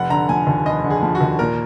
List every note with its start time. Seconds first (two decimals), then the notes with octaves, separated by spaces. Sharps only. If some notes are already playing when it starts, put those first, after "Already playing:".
Already playing: F1 F#5
0.10 D3 A#5
0.29 F3 G#5
0.47 D#2
0.65 F1 D#5
0.84 D3
0.90 G#4
1.03 F3
1.15 F#4
1.21 D#2
1.39 A#2 A#4